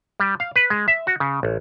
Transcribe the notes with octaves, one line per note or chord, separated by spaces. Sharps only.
G3
F5
B4
G#3
E5
F#4
C#3
A1